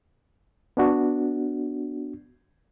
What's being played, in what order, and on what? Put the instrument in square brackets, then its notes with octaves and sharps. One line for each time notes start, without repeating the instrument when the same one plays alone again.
[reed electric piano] B3 D4 F#4